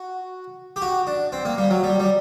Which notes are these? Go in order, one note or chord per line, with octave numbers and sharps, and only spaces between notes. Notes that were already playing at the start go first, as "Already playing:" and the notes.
Already playing: F#4
G4
F#4
D4
C4
A#3
G3
F#3
G3
G3